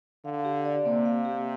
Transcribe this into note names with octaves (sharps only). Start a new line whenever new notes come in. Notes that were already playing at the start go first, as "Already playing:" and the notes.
D3 F5
G4
D5
C3 A#3
F5
G4